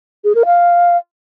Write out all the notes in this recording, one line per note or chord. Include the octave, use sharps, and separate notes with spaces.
G#4
A#4
F5